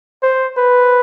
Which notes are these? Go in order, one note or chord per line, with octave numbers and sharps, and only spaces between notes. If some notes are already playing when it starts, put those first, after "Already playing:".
C5
B4